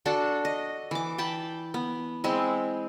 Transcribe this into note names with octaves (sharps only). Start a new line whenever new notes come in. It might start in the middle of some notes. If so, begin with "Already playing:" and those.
D4 F#4 A4
D#5
E3 D6
G5 A5 B5
B3
G#3 C4 E4